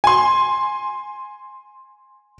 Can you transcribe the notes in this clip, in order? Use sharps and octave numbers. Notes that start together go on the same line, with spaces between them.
G#5 C6